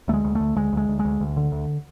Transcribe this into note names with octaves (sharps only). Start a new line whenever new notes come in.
D2 A3
G#3
D2
D2 A3
D2 G#3
D2 G#3
D2
G#3
D2
D2
D3
D2